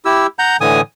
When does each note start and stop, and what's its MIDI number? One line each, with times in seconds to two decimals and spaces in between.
0.05 0.27 64
0.05 0.27 67
0.05 0.27 88
0.39 0.57 78
0.39 0.57 82
0.39 0.57 91
0.61 0.81 45
0.61 0.81 50
0.61 0.81 52
0.61 0.81 80
0.61 0.81 87